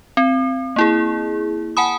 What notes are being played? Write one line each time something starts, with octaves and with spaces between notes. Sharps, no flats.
C4
A#3 E4 G#4
F#5 G#5 A5 B5 D#6